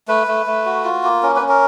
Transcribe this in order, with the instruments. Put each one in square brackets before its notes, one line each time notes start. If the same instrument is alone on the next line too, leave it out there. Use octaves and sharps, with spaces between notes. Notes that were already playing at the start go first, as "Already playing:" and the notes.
[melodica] A3 B4
A3
A3
F#4
F4
A#3
C#4 A#4
B4
C#4
A#4